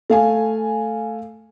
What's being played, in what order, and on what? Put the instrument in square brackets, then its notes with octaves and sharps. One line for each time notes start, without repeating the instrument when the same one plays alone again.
[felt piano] A3 F5 G#5